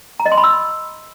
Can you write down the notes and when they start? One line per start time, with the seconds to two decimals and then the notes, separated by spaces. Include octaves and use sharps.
0.20 A#5
0.26 D#5
0.32 C6
0.38 B5
0.44 E6